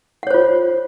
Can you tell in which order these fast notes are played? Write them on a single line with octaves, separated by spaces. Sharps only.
F#5 C#5 C5 F4